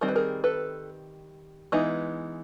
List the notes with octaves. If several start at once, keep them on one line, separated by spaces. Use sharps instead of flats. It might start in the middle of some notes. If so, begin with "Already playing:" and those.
D#3 G3 C4 A#4
B4
G#4 A#4
A4 B4
E3 G#3 B3 D#4